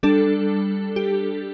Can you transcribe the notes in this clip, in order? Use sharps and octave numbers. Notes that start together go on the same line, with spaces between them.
G3 D4 A4
G4